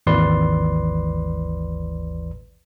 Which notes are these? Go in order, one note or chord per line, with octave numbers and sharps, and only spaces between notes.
G#1 D#2 E3 B4 D5 C6